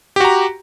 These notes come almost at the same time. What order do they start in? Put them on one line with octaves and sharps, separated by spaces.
G4 F#4 A#5